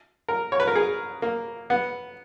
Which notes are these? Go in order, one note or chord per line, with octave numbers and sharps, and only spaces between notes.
A#4
C#5
B4
A#4
G#4
A#3
B3